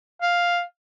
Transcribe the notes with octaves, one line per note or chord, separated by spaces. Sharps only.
F5